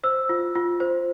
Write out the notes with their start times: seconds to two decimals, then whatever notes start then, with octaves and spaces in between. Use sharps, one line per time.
0.03 C5 E6
0.29 F4
0.55 F4
0.80 C5